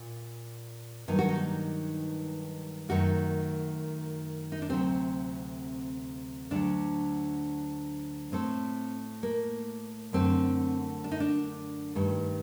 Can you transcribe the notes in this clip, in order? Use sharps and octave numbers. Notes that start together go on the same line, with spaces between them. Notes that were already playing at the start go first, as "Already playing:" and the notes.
Already playing: A#2
G2 D#3 F#3 A#3 D#4
F#4
D#4
F#2 D#3 A3 F#4
D#4
D4
D2 C3 F#3 A3 C4
D2 D3 F#3 A3 D4
A2 A3 C4
A#3
F#2 D3 A3 C4
D4
D#4
D4
G2 D#3 A3